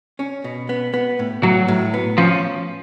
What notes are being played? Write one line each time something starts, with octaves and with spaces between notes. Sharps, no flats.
C#4
B2
B3
B3
A2
A2 F#3
A2
B3
F3 C#4